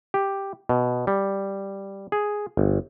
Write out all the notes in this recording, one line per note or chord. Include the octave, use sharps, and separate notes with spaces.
G4
B2
G3
G#4
G1